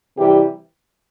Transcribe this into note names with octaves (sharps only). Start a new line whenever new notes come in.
C3 E3 G3 G4